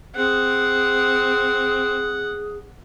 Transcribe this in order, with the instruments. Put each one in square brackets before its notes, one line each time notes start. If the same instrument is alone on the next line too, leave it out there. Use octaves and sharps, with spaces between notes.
[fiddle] C4 [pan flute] G#4 [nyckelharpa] F#5